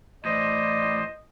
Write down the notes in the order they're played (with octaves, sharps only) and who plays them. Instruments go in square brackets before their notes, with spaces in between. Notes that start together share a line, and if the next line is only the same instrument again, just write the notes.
[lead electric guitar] A2 E3 [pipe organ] C5 [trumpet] D5 [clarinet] D#5